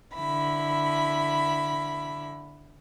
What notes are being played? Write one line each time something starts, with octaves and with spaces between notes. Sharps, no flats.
D3 E4 B5